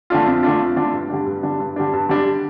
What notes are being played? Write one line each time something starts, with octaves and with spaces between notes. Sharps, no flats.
D3 A3 D4 F4
F2
D3 A3 D4 F4
F2
D3 A3 D4 F4
G2
D3 G3 D4
G2
D3 G3 D4
G2
D3 G3 D4
G2
D3 G3 D4